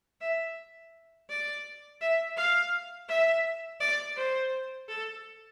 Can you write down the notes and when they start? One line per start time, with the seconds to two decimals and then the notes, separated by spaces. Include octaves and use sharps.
0.21 E5
1.29 D5
2.01 E5
2.37 F5
3.09 E5
3.80 D5
4.16 C5
4.88 A4